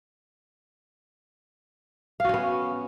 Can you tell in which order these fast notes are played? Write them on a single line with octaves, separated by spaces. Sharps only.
F5 F#4 C#4 B3